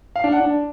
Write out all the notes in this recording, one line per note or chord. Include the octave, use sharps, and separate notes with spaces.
F5
D4
F#5
D4